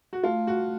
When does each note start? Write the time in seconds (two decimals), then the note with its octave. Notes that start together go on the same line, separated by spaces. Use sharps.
0.13 F#4
0.23 A3 F4
0.47 F#4